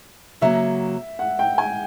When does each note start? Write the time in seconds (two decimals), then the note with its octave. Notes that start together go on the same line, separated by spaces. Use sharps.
0.41 C#3 F#3 A#3 E5
1.19 F#5
1.39 G5
1.58 G#5